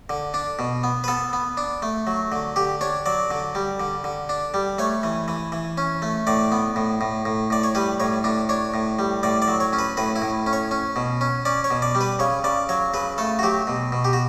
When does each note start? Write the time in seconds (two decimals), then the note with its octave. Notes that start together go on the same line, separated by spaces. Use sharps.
0.10 D3
0.34 D4
0.59 B2
0.84 B3
1.04 B4
1.08 B3 A4
1.33 B3
1.57 D4
1.82 A3
2.07 F#3
2.32 D3
2.56 D3 G4
2.81 D4 C#5
3.06 F#3 D5
3.31 D3
3.55 G3
3.80 D3
4.04 D3
4.29 D4
4.54 G3
4.78 A3 C#5
5.03 E3
5.28 E3
5.52 E3
5.78 C#4
6.02 A3
6.27 A2 D5
6.52 B3
6.76 A2
7.01 A2
7.25 A2
7.50 A2 D5
7.63 C#5
7.75 G3 B4
8.00 A2 C#5
8.24 A2 D4
8.49 D4 C#5
8.74 A2
8.99 G3
9.23 A2 D5
9.42 D5
9.48 F#3
9.60 C#5
9.73 C#4
9.79 B4
9.97 A2 B4
10.16 E4
10.22 A2
10.46 C#4
10.53 C#5
10.71 C#4
10.96 B2
11.21 C#4
11.45 C#4 D5
11.64 C#5
11.70 B2
11.82 D5
11.95 G3
12.01 B4
12.19 C#3 C#5
12.44 C#3 D5
12.69 F#3 C#5
12.94 C#3 B4
13.18 A3 A4
13.39 F#4
13.43 F#3 G4
13.67 B2
13.92 B2
14.04 G4
14.13 F#4